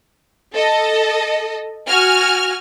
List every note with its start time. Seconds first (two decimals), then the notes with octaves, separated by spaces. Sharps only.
0.54 A4 D#5
1.88 F#4 G#5 F6